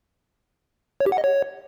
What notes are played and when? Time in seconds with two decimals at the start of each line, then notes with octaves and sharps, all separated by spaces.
1.00 C#5
1.06 G4
1.12 F#5
1.18 D#5
1.24 C#5